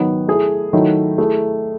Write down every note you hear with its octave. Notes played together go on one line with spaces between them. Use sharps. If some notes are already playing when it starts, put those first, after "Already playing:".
Already playing: D#3 F#3 B3
A3 E4 G#4
D#3 F#3 A3 E4
A3 E4 G#4